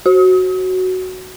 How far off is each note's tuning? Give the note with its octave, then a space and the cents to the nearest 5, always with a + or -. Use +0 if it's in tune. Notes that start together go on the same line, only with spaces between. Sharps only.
F#4 +5